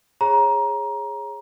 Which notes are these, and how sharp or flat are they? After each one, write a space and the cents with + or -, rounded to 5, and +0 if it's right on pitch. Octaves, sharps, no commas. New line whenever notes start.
G#4 -5 C#5 -25 A#5 +20